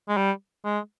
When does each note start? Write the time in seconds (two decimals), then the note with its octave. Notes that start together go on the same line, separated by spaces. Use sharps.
0.09 G#3
0.17 G3
0.65 G#3